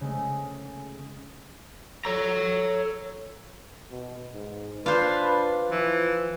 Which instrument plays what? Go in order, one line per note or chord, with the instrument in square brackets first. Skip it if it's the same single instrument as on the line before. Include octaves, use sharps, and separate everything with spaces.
[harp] C#3 G#3 A3
[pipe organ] A4 [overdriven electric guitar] C#5 A#5
[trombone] B2
G#2
[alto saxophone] D4 [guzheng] F4 C5 [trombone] B4
[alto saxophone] E3 [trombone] F3